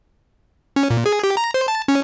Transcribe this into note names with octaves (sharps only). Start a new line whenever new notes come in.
C#4
A#2
G#4
G4
A#5
C5
A5
C#4